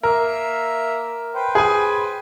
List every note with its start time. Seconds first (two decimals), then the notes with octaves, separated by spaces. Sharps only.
0.03 A#3 A#4 E5
1.35 B4 C5 G5
1.55 G#4 G#5